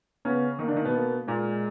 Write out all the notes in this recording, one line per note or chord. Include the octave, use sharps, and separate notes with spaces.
C#3 B3 C#4
D#3 A#3 D#4
D3 D4
D#3 D#4
B2 B3
A#3
A#2 G#3 A#3